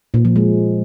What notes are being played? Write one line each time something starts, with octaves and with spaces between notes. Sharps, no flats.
A#2
F3
G#3